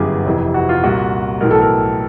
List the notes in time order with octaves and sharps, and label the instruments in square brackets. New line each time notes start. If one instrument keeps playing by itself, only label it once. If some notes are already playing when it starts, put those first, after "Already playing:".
Already playing: [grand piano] G1 F#2 C#3 E3 G4 G#4
F1 F2 C3 E3
F#4
F4
C2 A#2 F#4
B1 A2 E3 A#4
A4
A#4